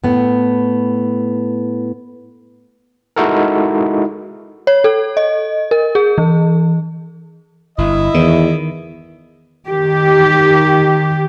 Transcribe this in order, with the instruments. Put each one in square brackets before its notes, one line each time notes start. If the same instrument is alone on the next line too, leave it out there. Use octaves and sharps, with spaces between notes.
[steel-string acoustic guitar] A2 B3
[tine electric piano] G#3 D#4 E4 F#4 A4 A#4
[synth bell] C#5
A4
D#5
A#4
G#4
E3
[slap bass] G1 [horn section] E4 D#5
[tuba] E2 [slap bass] D#3
[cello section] D#3 G4